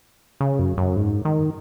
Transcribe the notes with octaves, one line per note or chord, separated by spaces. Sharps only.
C#3
F#2
F#2
G#2
D#3